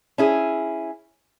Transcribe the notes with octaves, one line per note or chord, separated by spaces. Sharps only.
C#4 E4 G#4